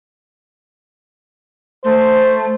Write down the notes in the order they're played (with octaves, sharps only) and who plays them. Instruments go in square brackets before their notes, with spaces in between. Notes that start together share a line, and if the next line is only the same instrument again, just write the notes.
[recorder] A3 [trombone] C5